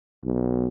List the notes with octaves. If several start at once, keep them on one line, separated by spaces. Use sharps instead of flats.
B1